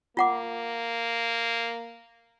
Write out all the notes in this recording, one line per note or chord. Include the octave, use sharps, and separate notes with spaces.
A#3 F4 F#5 D6